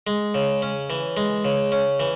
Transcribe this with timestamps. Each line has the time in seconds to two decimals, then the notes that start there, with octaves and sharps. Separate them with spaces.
0.07 G#3
0.35 C#3
0.62 C#4
0.90 E3
1.17 G#3
1.45 C#3
1.72 C#4
2.00 E3